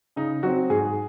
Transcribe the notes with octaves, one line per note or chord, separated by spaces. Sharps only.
C#3 D#4
F#3 C4 F#4
G#2 G#4